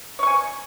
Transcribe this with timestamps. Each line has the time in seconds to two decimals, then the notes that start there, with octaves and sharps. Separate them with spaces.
0.19 C#5
0.23 C#6
0.27 G#5